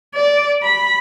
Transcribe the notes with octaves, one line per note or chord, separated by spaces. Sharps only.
D5
B5